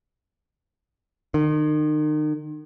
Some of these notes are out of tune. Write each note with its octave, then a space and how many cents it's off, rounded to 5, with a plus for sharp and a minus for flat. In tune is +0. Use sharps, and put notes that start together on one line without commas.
D#3 -35